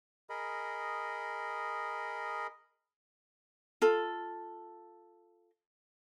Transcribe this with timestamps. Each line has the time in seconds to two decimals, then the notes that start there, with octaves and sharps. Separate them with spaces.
0.30 G#4 A#4 D#5 B5
3.82 F4 A4